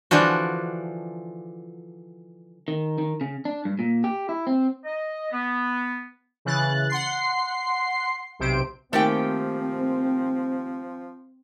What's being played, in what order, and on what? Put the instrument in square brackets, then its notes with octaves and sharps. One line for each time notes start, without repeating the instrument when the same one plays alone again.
[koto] D3 E3 F3 D4 F#4
[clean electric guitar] D#3
D#3
C#3
D4
G2
A#2
G4
E4
C4
[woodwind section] D#5
B3
[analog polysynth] C#3 E3 F#6 A6
F#5 C6 C7
B1 C3 C5 D7
[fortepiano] D#3 A#3 G#5 [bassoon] F3 [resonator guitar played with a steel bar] A3 G4 G5 [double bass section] C4